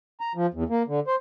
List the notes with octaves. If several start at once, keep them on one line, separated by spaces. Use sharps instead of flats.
A#5
F3
E2
A#3
D3
C5